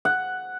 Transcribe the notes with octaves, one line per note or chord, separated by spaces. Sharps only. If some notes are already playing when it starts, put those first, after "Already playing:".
F#5